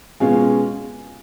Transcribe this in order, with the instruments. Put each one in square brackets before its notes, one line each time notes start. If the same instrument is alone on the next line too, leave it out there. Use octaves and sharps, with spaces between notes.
[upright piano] B2 G#3 C#4 F4 G#4